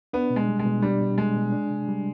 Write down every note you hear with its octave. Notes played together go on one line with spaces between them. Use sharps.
B3 D4
B2
G#3
G3
G#3
B2
G3 D4
B2
G3 G#3
B2
D4
C3
G3